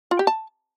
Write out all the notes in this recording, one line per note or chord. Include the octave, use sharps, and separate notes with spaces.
F4
G4
A5